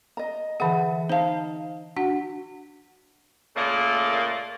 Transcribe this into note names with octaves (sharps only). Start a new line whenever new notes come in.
D#5 A#5
D3 E3 G#4 E5 F#5
D#4 C5 F5 A5
D4 F#4 F#5
A#2 C#3 A3 A#3 D5